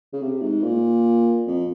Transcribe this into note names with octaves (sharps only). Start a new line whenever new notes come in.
C#3
C3
G#2
A#2
F2